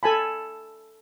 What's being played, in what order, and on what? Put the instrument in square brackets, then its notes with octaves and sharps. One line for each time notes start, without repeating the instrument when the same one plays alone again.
[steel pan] A4 G#5 A5 B5